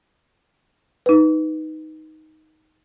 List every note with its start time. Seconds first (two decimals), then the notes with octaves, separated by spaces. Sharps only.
1.06 D#4 B4